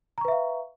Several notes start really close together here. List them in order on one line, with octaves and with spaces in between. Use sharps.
A#5 C#6 B4 E5 F5